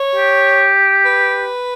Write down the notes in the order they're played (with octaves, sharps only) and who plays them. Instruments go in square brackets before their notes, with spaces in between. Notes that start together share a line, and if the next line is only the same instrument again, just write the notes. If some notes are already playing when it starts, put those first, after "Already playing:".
Already playing: [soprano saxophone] C#5
[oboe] G4
[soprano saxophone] B4